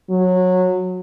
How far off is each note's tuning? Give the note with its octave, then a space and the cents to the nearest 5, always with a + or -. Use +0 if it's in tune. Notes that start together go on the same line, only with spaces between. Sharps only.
F#3 -20